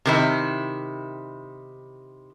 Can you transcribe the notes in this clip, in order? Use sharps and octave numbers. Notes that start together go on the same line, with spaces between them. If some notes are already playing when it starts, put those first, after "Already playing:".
C3 D#3 E4